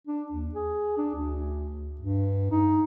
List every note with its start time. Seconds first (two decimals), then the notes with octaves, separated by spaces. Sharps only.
0.07 D4
0.32 D#2
0.55 G#4
0.98 D4
1.15 D2
2.01 G2
2.51 D#4